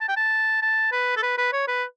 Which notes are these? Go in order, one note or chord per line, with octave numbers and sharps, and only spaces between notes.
A5
G5
A5
A5
B4
A4
B4
B4
C#5
B4